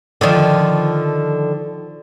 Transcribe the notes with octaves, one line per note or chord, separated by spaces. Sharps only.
D3 D#3 F3